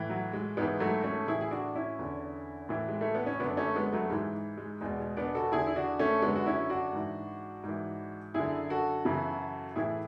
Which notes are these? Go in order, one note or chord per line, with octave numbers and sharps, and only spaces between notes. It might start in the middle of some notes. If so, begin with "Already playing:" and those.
Already playing: A2 E3
F#3
G#3
G#2 E3 G#3 B3
F#3 A3
A3 C#4
A2 E3 E4 G#4
G#4
D4 F#4
C#4 E4
E2 D3
A2 E3
G#3
A3
B3
C#4
F#2 D3 B3 D4
A3 C#4
G#3 B3
F#3 A3
G#2 E3 G#3
G#3
E2 B2 G#3
G#3
B3 D4
F#4 A4
E2 D3 E4 G#4
E4
D4 F#4
A3 C#4
F#2 D3 G#3 B3
F#4
C#4 E4
D4 F#4
G#2 E3
G#2 E3
F#2 D3 E4 G#4
F#4 A4
F#2 C#3 E3
A2 E3 E4 G#4